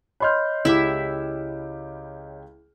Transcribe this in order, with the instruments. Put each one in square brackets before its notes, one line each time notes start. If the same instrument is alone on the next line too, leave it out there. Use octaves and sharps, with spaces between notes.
[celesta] C#5 D#5 G6 [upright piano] B5 C6 F6
[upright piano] C#2 G4 D6 [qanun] E4 E5